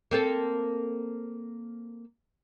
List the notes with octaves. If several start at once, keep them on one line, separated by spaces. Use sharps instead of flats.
A#3 C4 A4